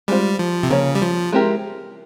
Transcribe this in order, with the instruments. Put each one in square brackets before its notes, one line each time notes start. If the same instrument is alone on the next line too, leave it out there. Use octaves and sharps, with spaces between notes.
[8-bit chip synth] G3 [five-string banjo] G#3 C4 F4 C5
[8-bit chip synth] F3
C3
[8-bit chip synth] C#3 [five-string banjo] F3 A#3 C#5
[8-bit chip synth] G3
F3
[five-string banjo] G#3 C4 E4 G4 A#4